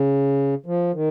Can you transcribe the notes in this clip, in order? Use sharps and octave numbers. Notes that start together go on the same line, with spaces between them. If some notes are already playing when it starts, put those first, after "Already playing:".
Already playing: C#3
F3
D#3